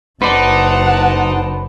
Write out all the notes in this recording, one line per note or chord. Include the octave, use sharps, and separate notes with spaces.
F#1 D#4 B4 C5 D5 F#5 A5